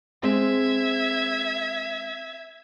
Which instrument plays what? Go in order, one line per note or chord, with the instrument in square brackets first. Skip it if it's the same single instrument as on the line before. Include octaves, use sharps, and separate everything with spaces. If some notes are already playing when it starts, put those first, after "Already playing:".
[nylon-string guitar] G#3 C4 G#4 [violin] E5 G#6